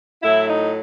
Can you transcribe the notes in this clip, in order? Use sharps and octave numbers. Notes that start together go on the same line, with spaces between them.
A2 F#3 E4
D#4